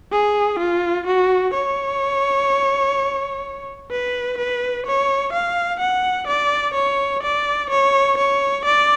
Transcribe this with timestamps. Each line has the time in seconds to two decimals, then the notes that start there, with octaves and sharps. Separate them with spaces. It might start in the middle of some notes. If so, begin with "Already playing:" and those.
0.12 G#4
0.59 F4
1.07 F#4
1.54 C#5
3.91 B4
4.38 B4
4.86 C#5
5.33 F5
5.80 F#5
6.28 D5
6.74 C#5
7.23 D5
7.70 C#5
8.18 C#5
8.65 D5